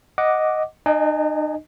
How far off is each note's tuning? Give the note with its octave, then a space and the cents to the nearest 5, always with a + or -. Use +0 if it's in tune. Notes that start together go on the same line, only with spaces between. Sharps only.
D#5 +0 F#5 +0 D6 +0
D#4 -45 D#5 +0 G#5 +0